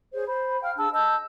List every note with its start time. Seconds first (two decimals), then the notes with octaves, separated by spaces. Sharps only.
0.14 G#4 C5 C#5
0.28 C5 B5
0.62 F5 G5 F6
0.77 D4 G#4 A5 E6
0.93 D#5 A5 E6 G6